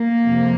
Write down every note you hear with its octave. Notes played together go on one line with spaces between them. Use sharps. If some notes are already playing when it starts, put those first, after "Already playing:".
Already playing: A#3
F2 C3 F3